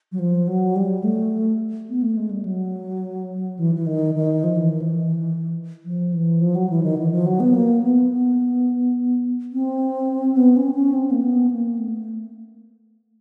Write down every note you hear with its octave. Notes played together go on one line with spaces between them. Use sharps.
F#3
F3
F#3
G3
A3
B3
A3
G#3
G3
F#3
E3
E3
D#3
D#3
F3
E3
D#3
E3
F3
E3
F3
F#3
E3
D#3
E3
F3
F#3
B3
A#3
B3
B3
C4
B3
C#4
C#4
C4
A#3
B3
A#3
A3